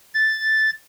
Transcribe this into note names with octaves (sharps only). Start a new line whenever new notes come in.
A6